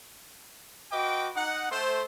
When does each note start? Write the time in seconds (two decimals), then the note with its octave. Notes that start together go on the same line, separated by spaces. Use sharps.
0.91 F#4 B4 D#5 G5 D6
1.35 D#4 F#5
1.71 A3 C5